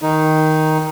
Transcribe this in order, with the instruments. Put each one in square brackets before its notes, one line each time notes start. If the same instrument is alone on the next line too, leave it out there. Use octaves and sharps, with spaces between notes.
[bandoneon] D#3 D#4